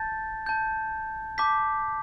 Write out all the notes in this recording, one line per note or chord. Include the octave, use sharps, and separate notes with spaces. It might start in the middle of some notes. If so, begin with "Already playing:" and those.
Already playing: A5 G6 A6
A5 G6
A5 D6 G6 B6